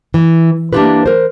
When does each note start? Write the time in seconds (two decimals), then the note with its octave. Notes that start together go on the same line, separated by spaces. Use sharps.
0.14 E3
0.73 A#3 D4 E4 F4 G4 B4
1.06 A#4 C5